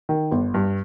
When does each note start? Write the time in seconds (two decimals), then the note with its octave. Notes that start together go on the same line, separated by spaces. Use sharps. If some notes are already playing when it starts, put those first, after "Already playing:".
0.09 D#3
0.31 G1
0.54 G2